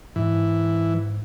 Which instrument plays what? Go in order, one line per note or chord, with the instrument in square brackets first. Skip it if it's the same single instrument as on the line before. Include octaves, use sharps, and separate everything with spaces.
[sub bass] G#2 [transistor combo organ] E3